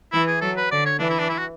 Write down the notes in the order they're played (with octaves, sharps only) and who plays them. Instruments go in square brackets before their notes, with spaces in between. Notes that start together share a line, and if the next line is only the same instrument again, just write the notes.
[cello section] E3 [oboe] E4
[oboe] G#4
[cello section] F#3 [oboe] A4
[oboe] B4
[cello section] D3 [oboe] D5
[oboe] C#5
[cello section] E3 [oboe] D4
[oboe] E4
D4
E4
F#4